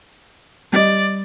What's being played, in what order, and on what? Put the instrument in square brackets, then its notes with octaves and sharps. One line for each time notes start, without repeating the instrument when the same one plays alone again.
[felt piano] G3 D#5 [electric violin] D5